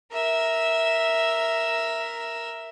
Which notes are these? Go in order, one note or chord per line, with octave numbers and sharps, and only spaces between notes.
A#4 E5